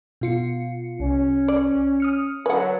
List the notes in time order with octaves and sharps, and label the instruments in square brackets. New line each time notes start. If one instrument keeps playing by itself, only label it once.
[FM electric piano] B2 F4 C#7
[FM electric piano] C2 [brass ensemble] C#4
[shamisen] D5
[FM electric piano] D#6 F6 C#7
[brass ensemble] D3 F#3 [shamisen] B4 F#5 [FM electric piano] C#5 G#5